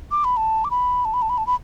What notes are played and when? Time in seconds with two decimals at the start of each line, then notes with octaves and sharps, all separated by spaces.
0.11 D6
0.24 B5
0.37 A5
0.65 D6
0.71 B5
1.05 A5
1.14 B5
1.22 A5
1.30 B5
1.38 A5
1.47 B5